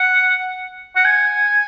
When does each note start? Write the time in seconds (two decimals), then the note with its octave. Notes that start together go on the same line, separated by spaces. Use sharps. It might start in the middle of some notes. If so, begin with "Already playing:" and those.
Already playing: F#5
0.96 F#5
1.05 G#5